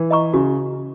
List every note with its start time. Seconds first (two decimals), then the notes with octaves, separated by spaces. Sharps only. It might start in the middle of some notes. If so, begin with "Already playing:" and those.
Already playing: E3
0.11 D#5 A#5 C#6
0.34 C#3 F#4